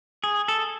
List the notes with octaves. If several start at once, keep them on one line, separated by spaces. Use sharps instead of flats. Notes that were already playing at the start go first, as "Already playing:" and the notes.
G#4
A4